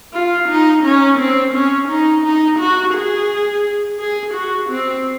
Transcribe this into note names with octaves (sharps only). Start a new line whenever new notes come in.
F4
D#4
C#4
C4
C#4
D#4
D#4
F#4
G#4
G#4
F#4
C4